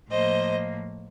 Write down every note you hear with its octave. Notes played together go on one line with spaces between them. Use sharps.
A2 F3 A#3 C5 D#5